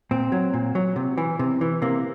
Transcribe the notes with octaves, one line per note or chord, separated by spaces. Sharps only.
A#2 C4
F#3
A#2
F#3
C3
E3
C3
E3
C3 A#3